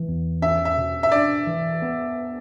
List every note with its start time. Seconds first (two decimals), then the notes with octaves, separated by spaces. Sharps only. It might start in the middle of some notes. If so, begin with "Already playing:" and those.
Already playing: E3
0.08 E2
0.42 C#4 E5
0.65 E5
0.77 B2
1.03 E5
1.12 D4 D5
1.47 E3
1.82 B3